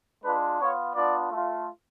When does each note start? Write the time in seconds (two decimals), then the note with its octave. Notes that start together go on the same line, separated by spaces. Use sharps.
0.24 G#3 D4 F4 B4
0.60 B3 F4 C#5
0.95 B3 D4 F4 D5
1.32 A3 F4